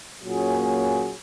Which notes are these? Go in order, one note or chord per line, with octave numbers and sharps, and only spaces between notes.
A#2 F#3 A#3 C#4 G#4